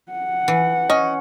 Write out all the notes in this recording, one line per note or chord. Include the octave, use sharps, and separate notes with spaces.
F#5
E3
C#4 D#5